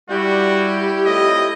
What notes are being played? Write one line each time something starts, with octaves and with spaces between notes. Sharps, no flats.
G3 E4 F#4 G4 G6
F2 A3 C#5 D#5